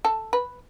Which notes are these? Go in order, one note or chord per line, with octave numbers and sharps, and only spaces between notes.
A4
B4